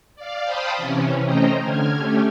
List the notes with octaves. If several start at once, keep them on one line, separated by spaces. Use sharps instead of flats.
D5 F5
C5 F5 G5 A5 B5 D#6
C3 E3 C#4
A3 C#4 C5 D#5 G5 A#5
D3 F6 G#6
A3 C#4 G4